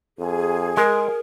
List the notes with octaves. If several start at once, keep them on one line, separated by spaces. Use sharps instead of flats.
F2 G#4
G#3 A#4